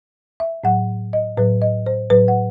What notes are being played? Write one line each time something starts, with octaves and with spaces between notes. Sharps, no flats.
E5
A2 F#3 F#5
D#5
A2 F#3 B4
D#5
C5
A2 F#3 B4
F#5